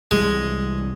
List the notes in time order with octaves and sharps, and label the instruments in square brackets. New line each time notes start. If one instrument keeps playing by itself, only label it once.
[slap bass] C2 E3 G3 [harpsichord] G#3